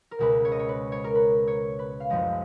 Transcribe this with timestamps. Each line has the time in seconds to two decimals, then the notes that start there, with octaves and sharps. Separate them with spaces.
0.11 A#4
0.19 C#2 B2 G#3 B4
0.45 C#5
0.52 D#5
0.59 C#5
0.69 B4
0.92 C#5
1.04 A#4
1.15 B4
1.47 C#5
1.79 B4
2.00 F5
2.10 F#1 F#2 F3 G#3 D#5